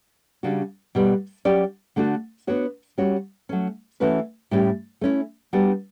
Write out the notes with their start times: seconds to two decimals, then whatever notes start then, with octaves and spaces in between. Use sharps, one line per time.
0.43 C#3 G3 D4 F#4
0.95 B2 G3 B3
1.45 F#3 C#4 G4 D5
1.96 D3 A3 D4 F#4
2.47 B3 D4 F#4 C#5
2.98 G3 C#4 F#4 C#5
3.49 F#3 A3 C#4
4.00 E3 A3 C#4 F#4 B4
4.51 A2 G3 C#4 G4
5.01 A3 C#4 E4
5.53 G3 B3 D4 F#4